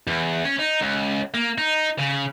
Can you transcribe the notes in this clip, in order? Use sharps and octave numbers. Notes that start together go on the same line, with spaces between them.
E2
C#4
D#4
C#2
A#3
D#4
C#3